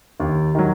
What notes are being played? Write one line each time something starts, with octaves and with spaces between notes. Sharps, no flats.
D#2
D#3 F#3